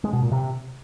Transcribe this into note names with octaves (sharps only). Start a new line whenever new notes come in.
G#3
B2
A#2
C3